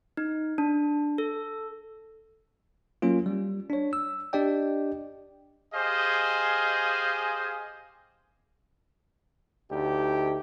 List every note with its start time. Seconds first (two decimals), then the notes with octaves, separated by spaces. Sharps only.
0.17 D#4
0.58 D4
1.18 A4
3.02 F#3 A#3 C#4 F4
3.26 G3
3.70 D4 C#5
3.93 E6
4.33 D4 G4 D5 D#5 G5
5.74 G4 G#4 C5 D#5 F5 G#5
9.71 D2 D#4 G4